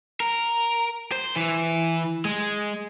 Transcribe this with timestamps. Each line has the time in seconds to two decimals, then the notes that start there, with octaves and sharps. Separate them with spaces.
0.20 A#4
1.12 C5
1.36 E3
2.25 G#3